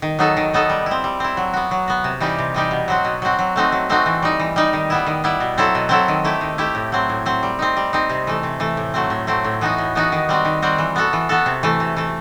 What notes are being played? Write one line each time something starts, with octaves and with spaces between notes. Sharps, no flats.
D#3
F#3 B3 D#4 A4
D#3
F#3 B3 D#4 A4
G3
C4 E4
G3
C4 E4
F#3
B3 F#4
F#3
B3 F#4
C3
E3 G3 D#4 G4
C3
E3 G3 D#4 G4
B2
F#3 C4 F#4
B2
F#3 C4 F#4
F#3
A3 C4 D#4 F#4
F#3
A3 C4 D#4 F#4
E3
G3 D#4
E3
G3 D#4
D#3
G3 B3 E4
D#3
G3 B3 E4
B2
F#3 C4 E4 A4
B2
F#3 C4 E4 A4
D#3
A3 E4 G4
D#3
A3 E4 G4
A2
F#3 C4
A2
F#3 C4
G3
C4 D#4
G3
C4 D#4
C3
E3 A3
C3
E3 A3
A2
F#3 A3 C4
A2
F#3 A3 C4
A2
E3 B3 D#4 F#4
A2
E3 B3 D#4 F#4
D#3
G3 C4 F#4
D#3
G3 C4 F#4
E3
B3 F#4 A4
E3
B3 F#4 A4
C3
E3 A3
C3
E3 A3